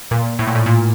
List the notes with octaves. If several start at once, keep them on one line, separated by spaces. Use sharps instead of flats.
A#2
A2
A#2
A2
A#2